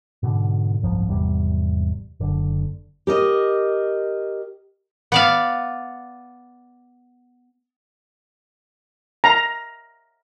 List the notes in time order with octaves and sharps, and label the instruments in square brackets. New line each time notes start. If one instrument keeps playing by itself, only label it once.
[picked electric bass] G#2 B2 D3
F#1 C2 G#2 F3
G#1 E2 C3 G3
F#1 D3
[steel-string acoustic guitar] G4 A#4 D#5
[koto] B3 D5 F5
[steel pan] A#5